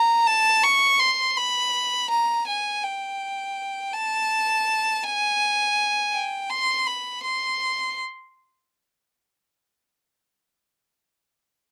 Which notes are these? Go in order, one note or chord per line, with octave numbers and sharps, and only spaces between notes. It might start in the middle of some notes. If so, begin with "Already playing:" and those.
Already playing: A#5
A5
C#6
C6
B5
A#5
G#5
G5
A5
G#5
G5
C6
B5
C6